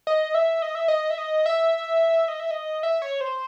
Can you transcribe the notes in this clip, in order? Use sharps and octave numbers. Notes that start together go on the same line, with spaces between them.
D#5
E5
D#5
E5
D#5
E5
D#5
E5
D#5
E5
D#5
E5
C#5
C5